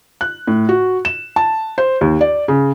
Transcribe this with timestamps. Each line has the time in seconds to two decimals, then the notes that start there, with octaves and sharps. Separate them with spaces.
0.21 F#6
0.47 A2
0.69 F#4
1.05 E7
1.36 A5
1.78 C5
2.01 D#2
2.21 D5
2.48 C#3